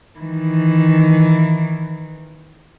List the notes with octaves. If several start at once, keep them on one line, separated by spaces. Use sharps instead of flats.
D#3 E3